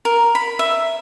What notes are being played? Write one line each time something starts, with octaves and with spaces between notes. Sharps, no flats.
A#4
B5
E5